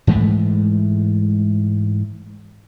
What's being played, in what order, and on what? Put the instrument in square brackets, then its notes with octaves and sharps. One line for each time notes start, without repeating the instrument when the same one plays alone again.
[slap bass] G#2 E3 G#3 A3